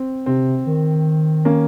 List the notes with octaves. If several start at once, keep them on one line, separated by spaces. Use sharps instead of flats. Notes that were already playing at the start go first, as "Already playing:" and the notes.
Already playing: C4
C3 C4
D#3
A#3 C#4